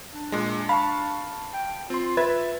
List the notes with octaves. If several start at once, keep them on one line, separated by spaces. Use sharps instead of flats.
D4
A#2 G#3
F5 A5 B5 C#6
G5
C4 F4 C6
B4 E5 G#6 A6